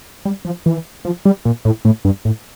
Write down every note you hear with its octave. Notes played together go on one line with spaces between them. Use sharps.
G3
F3
E3
F3
G3
A#2
A2
A2
G2
A2